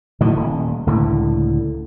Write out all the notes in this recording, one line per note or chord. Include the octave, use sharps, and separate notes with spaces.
A2 D3 D#3 F#3
D#1
C#2 A2 D3